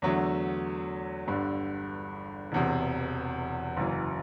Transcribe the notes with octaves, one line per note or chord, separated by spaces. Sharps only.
E2 D3 F#3 A3
G1 G2 D3
E1 E2 C3
F#1 F#2 E3